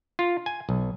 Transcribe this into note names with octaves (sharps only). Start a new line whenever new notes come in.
F4
G#5
B1